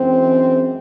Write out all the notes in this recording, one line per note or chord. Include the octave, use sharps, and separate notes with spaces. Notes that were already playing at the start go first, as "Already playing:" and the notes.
Already playing: F#2 E3 G#3 C4